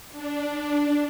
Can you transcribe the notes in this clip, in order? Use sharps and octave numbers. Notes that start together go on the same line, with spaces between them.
D4